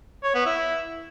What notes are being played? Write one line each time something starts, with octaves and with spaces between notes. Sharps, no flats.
C#5
B3
E4